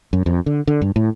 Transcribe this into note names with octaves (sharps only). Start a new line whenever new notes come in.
F#2
F2
D3
D3
G2
A2